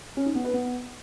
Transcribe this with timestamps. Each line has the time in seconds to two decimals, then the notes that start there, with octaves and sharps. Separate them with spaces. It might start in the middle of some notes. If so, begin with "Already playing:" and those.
0.17 C#4
0.26 D#4
0.35 B3
0.44 B4
0.54 B3